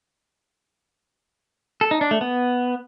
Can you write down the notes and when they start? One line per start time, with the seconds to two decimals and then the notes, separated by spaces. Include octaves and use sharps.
1.81 A4
1.91 D#4
2.01 D4
2.11 A3
2.21 B3